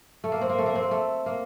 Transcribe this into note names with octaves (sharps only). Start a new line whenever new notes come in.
A3
A#3
C4
A#3
A3
A#3
C4
A#3
A3
A#3